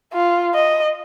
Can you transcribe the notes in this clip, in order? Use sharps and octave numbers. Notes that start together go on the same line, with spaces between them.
F4
D#5